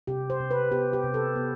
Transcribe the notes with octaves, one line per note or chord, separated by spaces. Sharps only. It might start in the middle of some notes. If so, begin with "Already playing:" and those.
C3 G4
C5
C3
B4
B3 G4
G4
C3
A4
B3